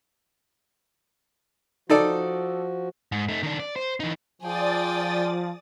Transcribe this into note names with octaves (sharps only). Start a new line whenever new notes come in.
F3 D#4 F#4 A4 D5
G#2
A3 D#4
D#3 D4
D5
C5
E3 D#4
F3 G#4 D5 G5 D#6 A6